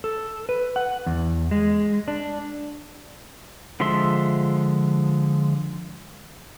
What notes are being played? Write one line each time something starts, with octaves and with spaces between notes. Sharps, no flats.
A4
B4
F#5
E2
G#3
D4
D3 F3 G#3 E5 C6